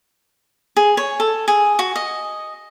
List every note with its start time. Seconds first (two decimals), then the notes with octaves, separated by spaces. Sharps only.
0.76 G#4
0.97 C#5
1.20 A4
1.48 G#4
1.79 F#4
1.96 D#5